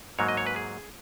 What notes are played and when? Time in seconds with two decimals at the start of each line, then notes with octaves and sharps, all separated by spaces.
0.19 G#2 F#3 A#3 C#5
0.28 D#5
0.37 C#5
0.47 B4
0.56 G#4